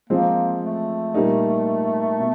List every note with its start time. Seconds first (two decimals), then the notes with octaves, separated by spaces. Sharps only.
0.10 F3 G#3 A#3 C4
0.63 A3
1.14 A#2 G3 A#3 D#4
2.20 B2